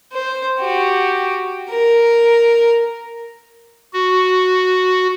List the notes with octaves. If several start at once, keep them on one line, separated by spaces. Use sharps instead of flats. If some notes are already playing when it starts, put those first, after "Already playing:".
C5
F#4 G4
A#4
F#4